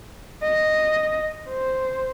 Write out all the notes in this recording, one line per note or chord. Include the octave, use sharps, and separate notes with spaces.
D#5
C5